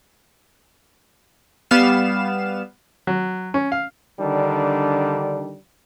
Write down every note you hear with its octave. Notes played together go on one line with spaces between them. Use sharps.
G3 B3 F5 E7
F#3
C#4
F5
D3 D#3 G3 D4